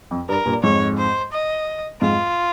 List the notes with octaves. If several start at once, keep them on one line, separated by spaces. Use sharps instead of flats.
F2
G2 A#4
G2 A#2
F2 G#2 C#5
C5
D#5
F2 G#2 F4